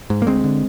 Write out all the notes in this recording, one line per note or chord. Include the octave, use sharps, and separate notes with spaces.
G#2
A#3
D2 G#3 C4
D3